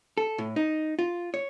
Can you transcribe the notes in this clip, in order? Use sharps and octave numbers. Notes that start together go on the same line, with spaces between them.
A4
A2
D#4
F4
C#5